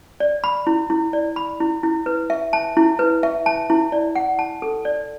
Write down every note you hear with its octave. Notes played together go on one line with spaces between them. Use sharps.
D5
B5
E4
E4
D5
B5
E4
E4
B4
E5
A5
E4
B4
E5
A5
E4
D5
F#5
A5
A4
D5